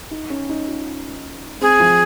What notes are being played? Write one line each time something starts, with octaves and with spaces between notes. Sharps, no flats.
D#4
C#4
D#4
F4
C4 G#4
F3